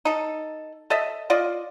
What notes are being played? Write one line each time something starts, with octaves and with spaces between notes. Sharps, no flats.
D#4 A4
A4 D#5 E5
F4 D5 D#5